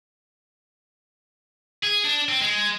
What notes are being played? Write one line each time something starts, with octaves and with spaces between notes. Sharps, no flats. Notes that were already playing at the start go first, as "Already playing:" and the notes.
G#4
D4
C4
G#3